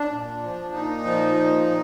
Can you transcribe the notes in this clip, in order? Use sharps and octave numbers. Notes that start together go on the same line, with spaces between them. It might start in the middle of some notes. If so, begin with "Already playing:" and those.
Already playing: D4
A#2
F3
A#2 D#4
F3
A#2
A#2